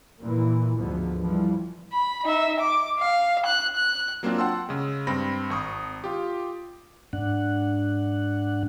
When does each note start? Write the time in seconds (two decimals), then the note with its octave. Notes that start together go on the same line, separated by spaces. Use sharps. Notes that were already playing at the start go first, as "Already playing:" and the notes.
0.20 A#2 E3
0.76 D2 G#2 D3 F3 B3
1.21 E3 F3 G3
1.92 B5
2.25 D#4 E5
2.60 D6
2.99 F5
3.46 F#6
3.76 F#6
4.23 F#3 A#3 C4 D4 F4
4.38 F#5 G5 A5 C6 E6
4.69 C#3 G#3
5.07 G2 C4 B5 A#6
5.50 G#1 C#6 D#6
6.04 F4 G4
7.13 G#2 D4 F#5